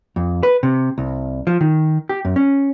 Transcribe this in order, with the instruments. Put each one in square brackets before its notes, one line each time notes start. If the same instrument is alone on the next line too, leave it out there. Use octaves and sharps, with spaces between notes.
[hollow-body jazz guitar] F2
B4
C3
C2
F3
D#3
G4
F#2
C#4